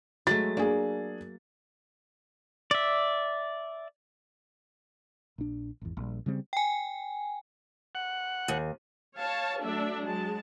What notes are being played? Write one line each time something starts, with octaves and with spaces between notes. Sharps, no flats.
F#3 G#3 A3 A6
A#3 D4 G#4
D5 E5
A#1 D4
G#1 E2
A#1 G3
C#3 G3 B3 C4
G5 G#5
F#5
D#2
C#5 F5 A5
F#3 A3 D4 E5
F#3 G#3 A5